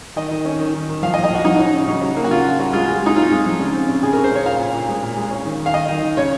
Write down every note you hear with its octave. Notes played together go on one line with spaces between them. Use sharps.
D#3 D#5
D#3
C#4
D#3
D#3
D#3
F3 F5
D#5
F3
D#5
F3 F#4
F3 D#4
C#4
C#3
C#3
F#3
A#3
F#4
C#3 F4
C#3
F#3
G#3 F4
G#3
G#3 D#4
C4 F4
G#3
F3
C#3
C4
C#3
C#3 G#4
C#3 A#4
C5
C#3 C#5
A#2 F5
A#2
A#2
G#3
A#2
G#3
C#4
D#3
D#3
F5
D#3 D#5
D#3
D#3
C#3 C#5